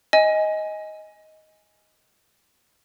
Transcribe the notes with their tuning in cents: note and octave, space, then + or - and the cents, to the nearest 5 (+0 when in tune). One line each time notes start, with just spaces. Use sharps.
D#5 +10 G#5 +0